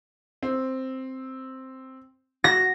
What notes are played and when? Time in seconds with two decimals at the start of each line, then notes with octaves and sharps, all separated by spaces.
0.43 C4
2.44 F#4 A#6